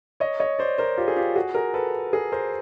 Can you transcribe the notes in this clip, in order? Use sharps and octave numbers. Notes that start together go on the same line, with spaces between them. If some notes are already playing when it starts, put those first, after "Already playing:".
C#5 D#5
C#5 D#5
C5 D5
A#4 C5
F4 G4
G#4
F4 G4
F#4 G#4
G#4 A#4
A4 B4
G#4 A#4
A#4 C5